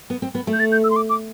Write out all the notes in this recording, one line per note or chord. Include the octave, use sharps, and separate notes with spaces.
B3
C4
B3
A3
G6
A6
G6
E6
C6
D6
D6